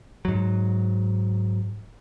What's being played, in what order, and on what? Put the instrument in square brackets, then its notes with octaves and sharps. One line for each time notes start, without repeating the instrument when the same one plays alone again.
[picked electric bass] G#2 F#3